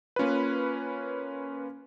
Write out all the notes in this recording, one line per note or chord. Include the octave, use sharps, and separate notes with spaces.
A#3 C#4 F4 B4